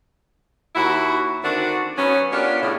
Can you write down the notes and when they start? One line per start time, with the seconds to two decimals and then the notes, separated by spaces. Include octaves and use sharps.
0.76 D#2 E4 F#4
1.44 D3 D#3 C4 D4 F#4
1.98 F#3 B3 C#4
2.32 B3 C#4 D4 F4 G4 A#4
2.62 A2 C#3